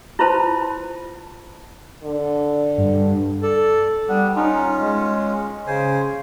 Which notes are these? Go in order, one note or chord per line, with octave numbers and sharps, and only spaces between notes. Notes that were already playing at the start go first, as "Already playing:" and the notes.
E4 F4 B4 C5 A5 C6
D3
G2
A4 D5
G3 B3 D4
C#4 D#4 F4
G#3
C#3 C5 G#5